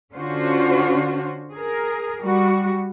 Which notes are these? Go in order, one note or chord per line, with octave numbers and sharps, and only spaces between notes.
D3 C#4 D4 F4 F#4 C5
G#4 A#4
G3 F#4